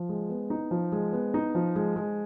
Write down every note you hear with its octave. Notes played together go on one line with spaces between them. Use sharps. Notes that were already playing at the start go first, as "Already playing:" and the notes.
Already playing: F3
G#3
B3
D#4
F3
G#3
B3
D#4
F3
G#3
G#3